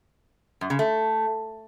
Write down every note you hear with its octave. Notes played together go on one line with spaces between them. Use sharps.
F#2
C#3
A3